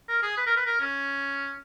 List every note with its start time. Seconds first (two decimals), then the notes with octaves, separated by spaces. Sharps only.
0.08 A#4
0.22 G#4
0.37 B4
0.46 A#4
0.56 B4
0.66 A#4
0.80 C#4